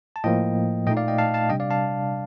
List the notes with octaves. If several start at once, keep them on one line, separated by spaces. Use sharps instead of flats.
A5
A2 F3 A#3 D#5 G5
A#2 A3 D#4 D#5 G5
D5 F5
D#5 G5
F5 A5
F5 A5
C3 G3 D4 D#5 G5
D5 F5
F5 A5